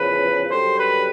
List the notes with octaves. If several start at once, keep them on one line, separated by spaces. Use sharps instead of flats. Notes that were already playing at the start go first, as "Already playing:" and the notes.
Already playing: E2 C#3 F3 B4
F#2 D3 G3 C5
B4